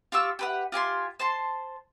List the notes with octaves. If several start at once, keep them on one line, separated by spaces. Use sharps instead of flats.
F4 G4 C#6 E6
G4 B4 F#5
F4 G4 G#5 C6
C5 A5 C6